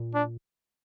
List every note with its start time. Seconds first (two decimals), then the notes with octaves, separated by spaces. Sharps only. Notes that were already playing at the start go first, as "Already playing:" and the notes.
Already playing: A#2
0.14 D4